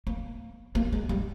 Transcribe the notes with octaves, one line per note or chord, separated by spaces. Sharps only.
A#3
A#3
G#3
G3